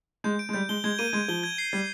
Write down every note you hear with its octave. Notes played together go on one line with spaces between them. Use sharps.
G#3 G6
D7
G#3
G3 G6
G#3 G7
G#3 G#6
A#3 D#7
G#3 G#6
F3 G7
G#6
C7
G3 G#6